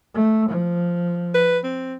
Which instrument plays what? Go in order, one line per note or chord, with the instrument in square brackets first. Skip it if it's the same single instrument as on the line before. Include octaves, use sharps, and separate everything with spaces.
[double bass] A3
F3
[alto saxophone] B4
C4